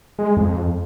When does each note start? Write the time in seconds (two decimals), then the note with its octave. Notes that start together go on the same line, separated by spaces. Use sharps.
0.19 G#3
0.37 F2